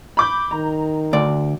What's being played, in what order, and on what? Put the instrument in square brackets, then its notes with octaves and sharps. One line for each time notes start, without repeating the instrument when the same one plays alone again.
[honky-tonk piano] B5 D6 G6
[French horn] D#3 [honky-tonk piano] A#5
[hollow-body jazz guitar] D2 D5